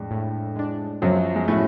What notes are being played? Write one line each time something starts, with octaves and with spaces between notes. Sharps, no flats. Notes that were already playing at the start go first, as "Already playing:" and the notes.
Already playing: F2 A2 G#3 D4
A2
G#3 D4
F#2 F3 F#3
G#3
A2 G#3 A3 C#4 F#4